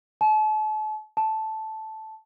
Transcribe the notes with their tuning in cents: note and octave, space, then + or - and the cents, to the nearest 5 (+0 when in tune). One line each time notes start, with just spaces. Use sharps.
A5 -40
A5 -5